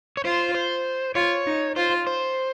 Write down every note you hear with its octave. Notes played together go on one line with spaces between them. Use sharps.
C#5
F4 C5
C5
F4 C#5
D#4
F4 C5
C5